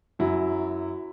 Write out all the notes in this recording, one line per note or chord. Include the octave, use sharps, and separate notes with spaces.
F#2 F#3 E4